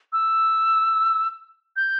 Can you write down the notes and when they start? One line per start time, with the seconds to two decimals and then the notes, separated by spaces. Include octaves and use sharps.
0.13 E6
1.76 G6